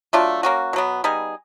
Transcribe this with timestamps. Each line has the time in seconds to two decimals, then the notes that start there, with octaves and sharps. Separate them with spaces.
0.13 F#3 A3 D4 F4
0.43 A#3 C#4 F#4
0.73 B2 F#3 B3
1.04 G3 B3 D#4 G#4